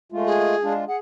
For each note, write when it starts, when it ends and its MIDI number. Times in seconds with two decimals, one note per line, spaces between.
0.12 0.55 56
0.12 0.55 57
0.12 0.55 65
0.26 0.73 68
0.63 0.84 56
0.63 0.84 62
0.63 0.84 65
0.88 0.99 68
0.88 0.96 78